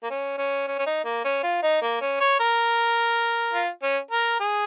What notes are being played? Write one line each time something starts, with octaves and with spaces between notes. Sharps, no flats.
A#3
C#4
C#4
C#4
C#4
D#4
A#3
C#4
F4
D#4
A#3
C#4
C#5
A#4
F4
C#4
A#4
G#4